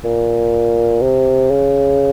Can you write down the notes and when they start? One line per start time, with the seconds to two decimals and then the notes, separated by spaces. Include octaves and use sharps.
0.04 A#2
1.02 C3
1.51 C#3